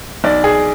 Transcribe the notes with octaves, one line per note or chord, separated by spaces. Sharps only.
B1 D5
G#4